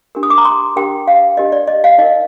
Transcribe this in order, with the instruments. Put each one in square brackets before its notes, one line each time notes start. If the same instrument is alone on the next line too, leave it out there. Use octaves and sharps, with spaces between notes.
[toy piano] D4 G4 A#4
D#6
D6
A#5
C6
D4 G4 A#4 G5
F5
D4 G4 A#4 D#5
D5
D#5
F5
D#4 A#4 D#5